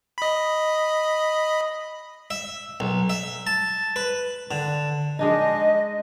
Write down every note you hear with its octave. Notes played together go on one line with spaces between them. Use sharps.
D#5 B5
E5
B1
E5
A5
B4
D3
G#3 D4 D#4 D#5